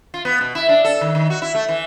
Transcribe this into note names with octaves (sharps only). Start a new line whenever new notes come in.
F4
B3
B2
E4
D4
A4
D#3
D#3
F#4
E4
A3
E3